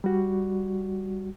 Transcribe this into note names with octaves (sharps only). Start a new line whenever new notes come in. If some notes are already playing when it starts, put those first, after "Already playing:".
G3 F#4